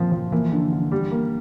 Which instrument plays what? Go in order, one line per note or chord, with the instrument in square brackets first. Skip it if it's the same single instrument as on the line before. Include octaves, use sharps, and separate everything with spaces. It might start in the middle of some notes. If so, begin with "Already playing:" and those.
Already playing: [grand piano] A#2 F3 C4 [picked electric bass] E3
[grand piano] F3
[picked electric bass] E3 [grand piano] A#3
[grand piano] D3
D3
G3
A#3